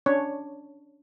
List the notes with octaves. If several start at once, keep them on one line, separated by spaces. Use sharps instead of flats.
C#4 D4 C#5